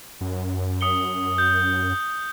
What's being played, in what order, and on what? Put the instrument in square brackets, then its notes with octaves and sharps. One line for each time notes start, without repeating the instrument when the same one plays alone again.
[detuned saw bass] F#2
[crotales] D#6 C#7 G7
G6